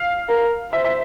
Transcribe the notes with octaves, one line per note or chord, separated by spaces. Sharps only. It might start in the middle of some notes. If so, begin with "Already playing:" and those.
Already playing: F5
A#4
C5 E5
E5